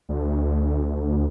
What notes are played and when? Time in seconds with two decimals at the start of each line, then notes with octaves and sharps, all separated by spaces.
0.09 D2